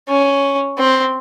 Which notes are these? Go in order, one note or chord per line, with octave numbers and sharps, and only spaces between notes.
C#4
C4